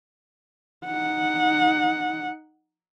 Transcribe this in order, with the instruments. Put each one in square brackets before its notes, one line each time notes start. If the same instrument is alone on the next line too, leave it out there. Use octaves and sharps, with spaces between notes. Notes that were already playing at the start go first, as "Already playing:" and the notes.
[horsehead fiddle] D#4 F#5